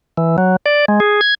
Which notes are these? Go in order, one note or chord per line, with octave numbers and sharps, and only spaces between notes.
E3
F#3
D5
G#3
G#4
G#6